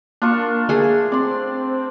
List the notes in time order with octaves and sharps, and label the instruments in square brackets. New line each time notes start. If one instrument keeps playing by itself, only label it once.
[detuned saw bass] A#3 [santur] D4 F4 C#6
[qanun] A3 G#4
[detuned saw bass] C4 [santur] D5 C6